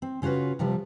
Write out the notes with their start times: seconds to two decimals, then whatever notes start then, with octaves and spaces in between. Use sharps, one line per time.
0.02 C4
0.22 C#3 C#4 F4 F#4 B4
0.59 C3 F3 G3 B4